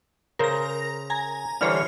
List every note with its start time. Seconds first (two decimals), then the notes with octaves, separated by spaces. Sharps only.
0.39 C#3 A#4 C5 A#6
1.10 G#5 A#5
1.61 D3 E3 G3 C5 C#5 F6